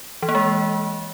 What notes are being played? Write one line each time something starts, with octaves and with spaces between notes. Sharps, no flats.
E3
A#3
G#3